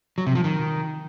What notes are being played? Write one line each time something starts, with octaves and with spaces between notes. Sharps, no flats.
F#3
C3
F3
D#3